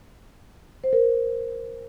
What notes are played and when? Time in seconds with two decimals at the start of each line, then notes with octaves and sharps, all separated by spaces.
0.84 C5
0.93 A#4